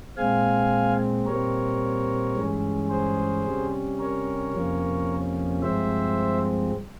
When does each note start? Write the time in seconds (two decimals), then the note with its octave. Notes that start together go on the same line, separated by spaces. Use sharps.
0.17 A#2 G#3 C4 F5 G#5
1.26 A#2 G3 C4 A#4 C#5
2.36 G2 E3 G#3 C#4
2.89 G#4 C5
3.44 C3 G3 C#4
3.99 A#4 C#5
4.53 F2 C3 F3 A#3 C#4
5.62 G2 F3 G#3 C4 C5 E5